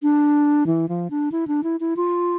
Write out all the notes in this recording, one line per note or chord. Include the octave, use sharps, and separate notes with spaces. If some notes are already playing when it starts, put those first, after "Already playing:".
D4
E3
F3
D4
E4
D4
E4
E4
F4